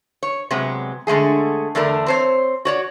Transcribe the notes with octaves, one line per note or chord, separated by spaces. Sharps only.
C#5
C3 F#3 G#3 B3
D3 G#3 A3 G#4
E2 D3 A3 D4 A#4
C4 C5 C#5
F#4 C#5 D5